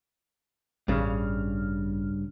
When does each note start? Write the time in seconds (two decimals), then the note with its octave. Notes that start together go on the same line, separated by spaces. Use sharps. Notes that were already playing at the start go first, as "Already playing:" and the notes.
0.88 A1 G2 C#3 F6